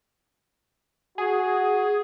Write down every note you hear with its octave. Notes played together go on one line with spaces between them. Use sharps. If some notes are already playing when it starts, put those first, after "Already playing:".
F#4 G#4